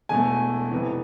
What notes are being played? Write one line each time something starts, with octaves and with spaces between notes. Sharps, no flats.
E1 E2 B2 A3 G#5
F1 F2 E3